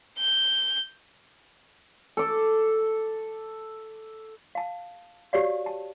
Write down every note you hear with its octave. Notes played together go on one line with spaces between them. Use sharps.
G6
A4 D6
F5 A5
F#4 G4 C#5 D5 F5
A5